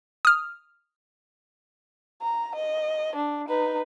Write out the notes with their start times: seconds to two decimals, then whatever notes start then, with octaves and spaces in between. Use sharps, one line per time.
0.25 D#6 F6
2.21 A#5
2.55 D#5
3.15 D4
3.48 D#4 B4